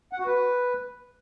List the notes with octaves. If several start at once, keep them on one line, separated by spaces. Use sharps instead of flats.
F#5
F#4
B4